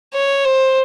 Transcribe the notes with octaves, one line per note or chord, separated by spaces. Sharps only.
C#5
C5